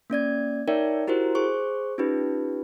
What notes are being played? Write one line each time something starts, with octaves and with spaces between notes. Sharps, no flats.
A#3 C#4 D5 G#6
D#4 A#4 C#5 D5 E5 G5
E4 F#4 G4 A#4 C5
G#4 C5 C#6
C#4 D#4 F4 G4 B4